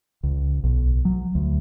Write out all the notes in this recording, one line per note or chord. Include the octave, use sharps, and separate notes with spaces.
C#2
B1
F#3
D2